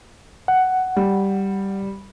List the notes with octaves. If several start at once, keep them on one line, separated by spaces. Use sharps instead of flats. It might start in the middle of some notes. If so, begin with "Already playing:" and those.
F#5
G3